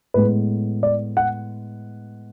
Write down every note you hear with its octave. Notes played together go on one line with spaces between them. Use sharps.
A2 G#3 B3 B4
D5
F#5